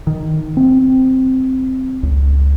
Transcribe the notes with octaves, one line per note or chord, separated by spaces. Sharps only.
D#3
C4
C#2